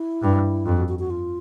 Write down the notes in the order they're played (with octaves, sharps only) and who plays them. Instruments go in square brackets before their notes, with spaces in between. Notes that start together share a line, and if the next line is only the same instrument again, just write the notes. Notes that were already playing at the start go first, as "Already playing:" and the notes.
Already playing: [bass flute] E4
[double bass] G2
[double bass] F2 [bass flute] F4
[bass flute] F#4
F#4
F#4
F4